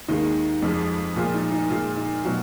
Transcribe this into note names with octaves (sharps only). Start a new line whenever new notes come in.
D#2 D#3 G#3 D#4
F2 F3 G#3
A#2 F3 G#3 F4
D#4
D#4
A#2 G#3 F4
D#4
B2 F#3 F4